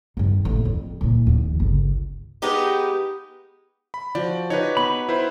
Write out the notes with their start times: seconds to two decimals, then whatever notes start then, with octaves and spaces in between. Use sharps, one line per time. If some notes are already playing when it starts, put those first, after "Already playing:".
0.17 G2 D#3
0.45 A1
0.65 F2
1.01 A#2 E3
1.27 D#2 F3
1.60 G1 C#2
2.42 G#3 B3 D#4 G4
3.94 B5
4.15 F3 F#4 D5
4.50 D#4 F#4 G4 B4 C#5
4.77 B3 B5
5.09 E4 B4 C5